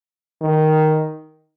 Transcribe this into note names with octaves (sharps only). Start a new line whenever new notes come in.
D#3